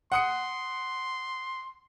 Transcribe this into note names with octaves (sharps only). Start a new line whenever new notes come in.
F#5 C6 D#6 C#7